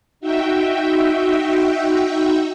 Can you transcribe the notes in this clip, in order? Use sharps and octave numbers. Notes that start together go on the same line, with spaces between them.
D#4 F#4 E5 G5